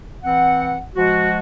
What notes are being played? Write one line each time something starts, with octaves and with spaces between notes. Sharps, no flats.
E3 C4 F#5
F3 G#3 F#4